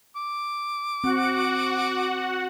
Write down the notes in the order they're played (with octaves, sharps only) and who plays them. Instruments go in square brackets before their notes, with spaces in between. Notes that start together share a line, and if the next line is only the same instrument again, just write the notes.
[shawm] D6
[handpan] C4 [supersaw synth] F#4 F#5